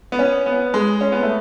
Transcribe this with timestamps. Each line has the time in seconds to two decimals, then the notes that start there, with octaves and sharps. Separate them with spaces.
0.12 B3
0.19 C#4
0.46 B3
0.74 G#3
1.01 C#4
1.12 B3
1.23 A3